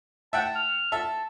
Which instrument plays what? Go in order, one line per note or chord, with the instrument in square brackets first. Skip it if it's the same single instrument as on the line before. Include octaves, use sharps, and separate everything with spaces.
[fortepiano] E5 F#5 G5 [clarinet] A5
[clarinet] F6
[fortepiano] A4 E5 [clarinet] A5